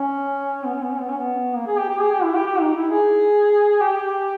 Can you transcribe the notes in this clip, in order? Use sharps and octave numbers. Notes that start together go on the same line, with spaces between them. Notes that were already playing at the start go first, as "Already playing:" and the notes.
Already playing: C#4
B3
C#4
B3
C#4
B3
C#4
B3
A#3
G#4
G4
G4
G#4
G4
E4
G4
G4
D#4
E4
G#4
G4